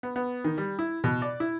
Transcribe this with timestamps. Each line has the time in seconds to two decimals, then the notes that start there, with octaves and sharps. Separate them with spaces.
0.03 B3
0.16 B3
0.44 D#3
0.58 G3
0.79 E4
1.04 B2
1.22 D5
1.40 E4